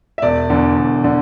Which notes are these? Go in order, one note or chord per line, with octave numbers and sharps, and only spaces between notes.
E5
E1 D5
E2 D3
E1
D3